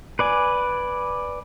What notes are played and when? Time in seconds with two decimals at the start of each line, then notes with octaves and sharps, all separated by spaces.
0.19 B4 D5 G#5